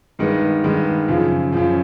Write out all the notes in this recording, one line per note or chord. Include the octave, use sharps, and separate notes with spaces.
G2 D#3 G#3 B3
G2 D#3 G#3 B3
F#2 C#3 F3
F#2 C#3 F3